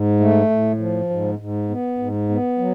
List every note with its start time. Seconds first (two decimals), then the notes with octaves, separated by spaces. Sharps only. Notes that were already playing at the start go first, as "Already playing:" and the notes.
Already playing: G#2
0.20 A3
0.50 A2
0.79 F3
1.10 G#2
1.39 G#2
1.70 B3
1.98 G#2
2.29 B3
2.58 F#3